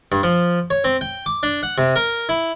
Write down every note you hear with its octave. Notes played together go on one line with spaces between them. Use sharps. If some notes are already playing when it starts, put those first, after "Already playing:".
G2
F3
C#5
C4
G5
D6
D4
F#5
C3
A#4
E4